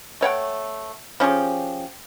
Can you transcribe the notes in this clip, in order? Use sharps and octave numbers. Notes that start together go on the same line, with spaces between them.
A3 C#5 F#5 G5
F3 C#4 G4 G#4